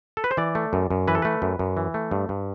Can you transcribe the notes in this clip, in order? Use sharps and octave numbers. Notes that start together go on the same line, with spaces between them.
A4
B4
C5
E3 D5
A3
F#2
F#2
E3 B4
A4
A3 B4
F#2
F#2
E3
A3
G2
G2